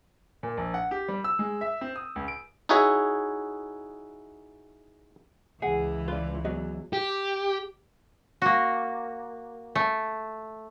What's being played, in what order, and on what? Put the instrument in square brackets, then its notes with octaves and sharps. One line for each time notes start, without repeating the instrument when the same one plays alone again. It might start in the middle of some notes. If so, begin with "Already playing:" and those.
[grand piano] A#2
A#1
F#5
G4
G3
E6
G#3
E5
C4
D#6
C#2
D7
[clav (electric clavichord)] D#4 E4 F#4 G#4 C#5 E5
[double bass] C#2 E3 [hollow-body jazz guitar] G#4 [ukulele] F#5
[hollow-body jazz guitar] F4 [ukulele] B4 D5
[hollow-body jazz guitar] E2 F#3 [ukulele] F#4 D5 D#5
[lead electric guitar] G4
[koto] A#3 F#4
A3